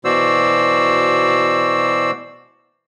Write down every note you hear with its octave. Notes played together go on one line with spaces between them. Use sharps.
B2 E3 F#4 C5 D5 E6